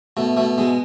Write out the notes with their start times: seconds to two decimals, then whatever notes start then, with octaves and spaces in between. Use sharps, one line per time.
0.17 B2 A3
0.37 B2 A3
0.58 B2 G#3